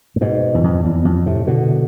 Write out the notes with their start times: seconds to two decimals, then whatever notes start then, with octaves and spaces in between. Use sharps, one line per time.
0.16 A2
0.21 G#2 B2
0.54 E2
0.64 F2
0.85 E2
1.05 F2
1.26 A2 C3
1.47 B2 D3